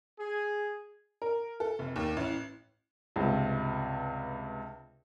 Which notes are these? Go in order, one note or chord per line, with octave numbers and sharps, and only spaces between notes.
G#4
A#4
A4
F1
D#2
A1
C#2 G2 C3